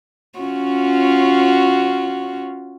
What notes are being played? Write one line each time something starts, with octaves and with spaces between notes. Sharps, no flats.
C#4 F4 F#4